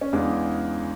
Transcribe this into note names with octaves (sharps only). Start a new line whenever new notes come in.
C#4
E2 C#3 G#3 D4